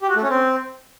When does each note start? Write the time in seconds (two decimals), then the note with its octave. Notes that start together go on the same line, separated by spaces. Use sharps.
0.02 G4
0.09 F#4
0.16 A3
0.23 C#4
0.30 C4